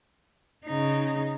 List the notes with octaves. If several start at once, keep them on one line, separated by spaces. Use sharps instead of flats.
C#3 D#4